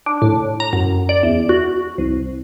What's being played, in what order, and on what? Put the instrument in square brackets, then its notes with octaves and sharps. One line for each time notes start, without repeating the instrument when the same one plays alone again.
[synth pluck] D4
A2
A#5
F#2
D5
E2
F#4
C2